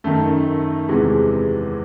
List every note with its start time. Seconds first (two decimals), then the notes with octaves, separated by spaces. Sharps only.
0.04 F#2 D#3 A3
0.88 E2 C3 E3 G#3